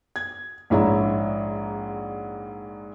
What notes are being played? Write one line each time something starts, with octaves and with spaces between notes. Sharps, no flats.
G#6
A#1 G#2 E4 C#5 E5 A#5